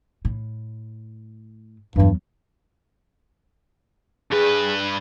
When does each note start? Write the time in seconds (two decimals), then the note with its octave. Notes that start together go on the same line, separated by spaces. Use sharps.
0.25 A2
1.96 E2 G2 F#3
4.32 G2 G#4 B4